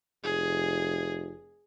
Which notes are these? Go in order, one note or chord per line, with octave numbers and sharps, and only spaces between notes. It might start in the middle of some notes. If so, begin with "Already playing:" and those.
F1 G#4